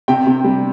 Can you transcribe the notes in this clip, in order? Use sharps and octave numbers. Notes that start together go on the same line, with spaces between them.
C3 G5
C3
G3